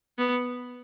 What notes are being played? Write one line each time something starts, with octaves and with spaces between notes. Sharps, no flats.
B3